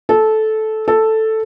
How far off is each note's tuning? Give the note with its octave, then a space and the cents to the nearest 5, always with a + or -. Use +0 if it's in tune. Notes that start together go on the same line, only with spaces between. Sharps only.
A4 -15
A4 +0